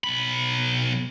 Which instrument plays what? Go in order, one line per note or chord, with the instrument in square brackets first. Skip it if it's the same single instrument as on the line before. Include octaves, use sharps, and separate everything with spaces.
[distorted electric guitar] B1 B5